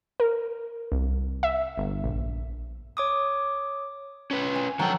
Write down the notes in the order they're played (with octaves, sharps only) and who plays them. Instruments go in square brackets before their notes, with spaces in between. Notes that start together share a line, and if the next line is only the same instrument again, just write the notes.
[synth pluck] A#4
C2
E5
G1
A#1
[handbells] C#5 D6 D#6
[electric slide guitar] C#4 B4
[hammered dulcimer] G#5
[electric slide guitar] D3 F3 G5 [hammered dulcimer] F#3 A4